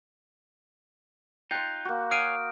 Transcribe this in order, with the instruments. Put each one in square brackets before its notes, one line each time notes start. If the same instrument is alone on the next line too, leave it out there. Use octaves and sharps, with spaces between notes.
[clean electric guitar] D#4 F4 [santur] G5 C6 [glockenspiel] F#6 G6
[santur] A#3 F#4
[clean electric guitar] C#5 F5 G#5 [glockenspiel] D#6 F6 D7